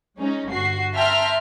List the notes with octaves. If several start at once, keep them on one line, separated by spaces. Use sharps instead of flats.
G#3 C#4 D#4
G1 F#4 C7
E5 G5 A5 A#5 C6 F6